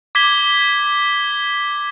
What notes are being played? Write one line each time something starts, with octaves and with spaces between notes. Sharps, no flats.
D6 G#6 B6 G7